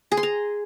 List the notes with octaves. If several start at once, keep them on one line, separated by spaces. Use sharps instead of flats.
G#4
C6
A#5